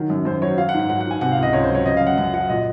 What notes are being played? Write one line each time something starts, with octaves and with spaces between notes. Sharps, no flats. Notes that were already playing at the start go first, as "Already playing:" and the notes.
Already playing: D#3 F#3
F#2
F#2 C5
F#3 C#5
F#3 F5
F#5
G#2
F#5
F#3 F#5
F#5
G#2 G#5
C3 F#5
F5
C#2
D#5
C#2 C#5
C5
F#3 C#5
C#3 D#5
F#2 F5
F#5
F#2 F#5
F#3 F#5
A#2 D#5